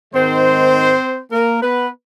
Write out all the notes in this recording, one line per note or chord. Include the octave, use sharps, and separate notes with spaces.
G#2 D#3 G#3 C4 C5
A#3 A#4
B3 B4